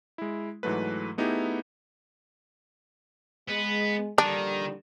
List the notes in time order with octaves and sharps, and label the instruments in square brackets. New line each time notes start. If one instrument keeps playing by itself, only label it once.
[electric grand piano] G#3 E4
G#2 E3 F#3 A3 B4
A3 B3 D#4 E4 G4 G#4
[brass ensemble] G#3 [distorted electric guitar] B3
[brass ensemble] A#1 D3 G3 [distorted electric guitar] D#3 [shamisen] D4